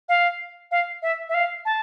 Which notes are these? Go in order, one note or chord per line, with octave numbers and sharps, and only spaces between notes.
F5
F5
E5
E5
F5
A5